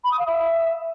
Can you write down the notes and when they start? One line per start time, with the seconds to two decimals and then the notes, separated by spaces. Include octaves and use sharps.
0.04 B5
0.11 D#6
0.19 F5
0.26 E5